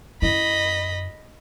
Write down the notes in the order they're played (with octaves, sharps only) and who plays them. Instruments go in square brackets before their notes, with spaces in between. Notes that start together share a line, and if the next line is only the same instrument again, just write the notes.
[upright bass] F#2 E4 [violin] D#5 B5